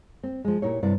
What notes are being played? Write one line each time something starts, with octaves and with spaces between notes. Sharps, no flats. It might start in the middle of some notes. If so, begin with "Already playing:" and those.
C4
F3 G#3
A#2 D#4 E4 G4 C#5
G2 C3 E4 D5